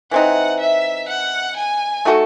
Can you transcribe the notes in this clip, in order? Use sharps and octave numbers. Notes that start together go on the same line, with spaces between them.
E3 C4 D#4 F#5
E5
F#5
G#5
A3 D#4 F#4 A4